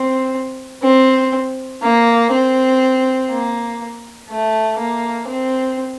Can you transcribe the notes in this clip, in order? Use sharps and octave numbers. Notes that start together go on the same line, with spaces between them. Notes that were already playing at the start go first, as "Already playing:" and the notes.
Already playing: C4
C4
A#3
C4
A#3
A3
A#3
C4